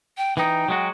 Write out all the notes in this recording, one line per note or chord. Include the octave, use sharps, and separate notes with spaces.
G5
E3 D#4 G5
F#3 G#3 F#4